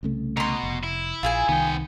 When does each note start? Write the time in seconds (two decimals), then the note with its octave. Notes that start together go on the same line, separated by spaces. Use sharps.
0.03 C2 C#3 A3
0.37 B2 A#5 C6
0.63 F1
0.83 E4
1.23 A#1 F4 G#4 G#5
1.49 C2 D#3 B3 G5